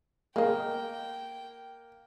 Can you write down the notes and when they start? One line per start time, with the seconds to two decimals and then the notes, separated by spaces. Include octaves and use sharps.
0.36 G#3 A#3 D#5 G5